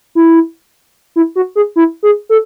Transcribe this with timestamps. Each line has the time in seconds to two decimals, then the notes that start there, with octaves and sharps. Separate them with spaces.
0.15 E4
1.16 E4
1.36 F#4
1.56 G#4
1.76 E4
2.03 G#4
2.29 A4